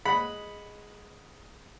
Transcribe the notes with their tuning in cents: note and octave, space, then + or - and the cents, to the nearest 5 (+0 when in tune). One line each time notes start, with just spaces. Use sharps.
G#3 +0 F#5 +0 B5 +0